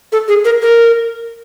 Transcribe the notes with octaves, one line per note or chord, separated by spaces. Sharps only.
A4
G#4
A#4
A#4